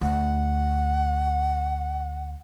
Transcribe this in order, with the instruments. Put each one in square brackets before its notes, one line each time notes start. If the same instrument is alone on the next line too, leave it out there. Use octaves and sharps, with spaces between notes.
[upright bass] D2 [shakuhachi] F#5